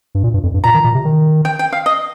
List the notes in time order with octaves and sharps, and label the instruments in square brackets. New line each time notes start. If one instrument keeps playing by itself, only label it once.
[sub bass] G2
A#2
G2
F2
G2
[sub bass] A#2 [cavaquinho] A#5
[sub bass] D#3
A#2
C3
D#3
[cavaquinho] G5
G5
F5
D#5